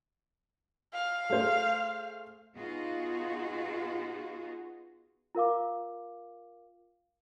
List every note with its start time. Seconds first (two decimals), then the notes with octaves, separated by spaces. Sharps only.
0.94 F5
1.30 A3 G#4 C5
2.56 B3 D#4 F4 F#4 G#4
5.35 F4 A#4 F5 D6